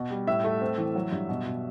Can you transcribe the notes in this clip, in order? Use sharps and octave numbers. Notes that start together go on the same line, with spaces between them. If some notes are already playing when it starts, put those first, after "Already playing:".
Already playing: B2
G3
A2 E5
A3
C4
E3
F#3
G2
B2
B2